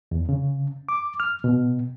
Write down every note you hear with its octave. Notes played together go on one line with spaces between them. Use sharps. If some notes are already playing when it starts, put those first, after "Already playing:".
E2
C#3
D6
F6
B2